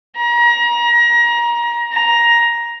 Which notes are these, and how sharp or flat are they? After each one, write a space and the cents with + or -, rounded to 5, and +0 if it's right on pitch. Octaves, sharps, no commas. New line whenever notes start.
A#5 +30
A#5 +10